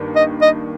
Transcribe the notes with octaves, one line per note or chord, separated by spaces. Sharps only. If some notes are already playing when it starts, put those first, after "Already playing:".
Already playing: G2 D#3 A#3 D4
D#5
D#5